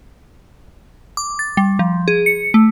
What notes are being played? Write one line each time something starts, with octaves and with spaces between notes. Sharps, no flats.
D6
A6
G3
F3
G#4
C#7
A3